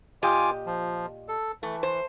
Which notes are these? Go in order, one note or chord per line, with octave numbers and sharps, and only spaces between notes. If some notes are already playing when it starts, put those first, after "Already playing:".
A#2 F4 G4 D#5 G#5 D6
F3
A4
E3 A3
C5